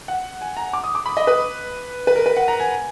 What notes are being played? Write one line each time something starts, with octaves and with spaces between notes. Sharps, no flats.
F#5
G#5
A#5
D6
D#6
D6
B5
D#5
B4
B4
A#4
B4
F#5
A#5
G#5